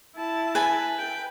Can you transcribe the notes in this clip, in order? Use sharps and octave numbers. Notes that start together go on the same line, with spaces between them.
E4 A5
B4 G#5
G5